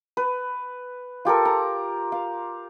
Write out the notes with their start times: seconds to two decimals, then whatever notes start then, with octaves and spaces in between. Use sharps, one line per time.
0.17 B4
1.25 F4 G4 A4 A#4
1.45 A#5
2.12 F5